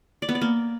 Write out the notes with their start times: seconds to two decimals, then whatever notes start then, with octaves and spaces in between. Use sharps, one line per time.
0.22 D5
0.29 B3
0.35 D5
0.41 A#3